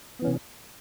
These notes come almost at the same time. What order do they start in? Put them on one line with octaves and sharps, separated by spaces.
B3 E3 C#4 C3